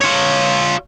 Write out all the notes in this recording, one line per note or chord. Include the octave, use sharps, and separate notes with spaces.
F4 C#5